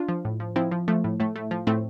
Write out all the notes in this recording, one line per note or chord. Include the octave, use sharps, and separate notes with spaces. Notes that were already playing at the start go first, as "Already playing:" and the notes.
Already playing: D4 F4
F3
A2
F3
F3 C4 E4
F3
F3 A3
A2
A2 A3
A2 A3
F3
A2 A3 C4